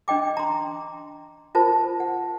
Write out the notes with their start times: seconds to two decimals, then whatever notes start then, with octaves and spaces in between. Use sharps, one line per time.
0.08 C#4 D4 D#5 G5 D6
0.37 A#5 C6
1.55 F4 A#4 C5 A5
2.00 F#5